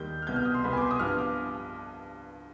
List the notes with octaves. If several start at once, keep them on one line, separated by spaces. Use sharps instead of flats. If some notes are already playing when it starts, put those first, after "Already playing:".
Already playing: D#2 D#3 G3 G6
F6
C2 B2 B3 G6
F6
D#6
C6
C2 B2 B3 B5
G#5 D6
C6
D#6
G2 F3 B3 F6
D6